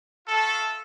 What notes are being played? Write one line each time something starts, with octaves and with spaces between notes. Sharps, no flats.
A3 F4 A4